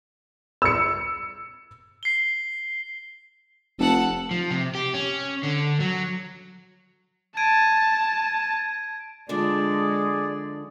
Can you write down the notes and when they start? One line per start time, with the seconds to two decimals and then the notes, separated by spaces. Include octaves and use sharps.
0.62 E6 C#7
2.03 C7 G7
3.79 F1 A4 F#5
4.31 F3
4.51 C3
4.75 G4
4.94 C#4
5.43 D3
5.80 F#3
7.37 A5 G#6 D7 D#7
9.29 D3 F3 G#3 D4 G#4 D5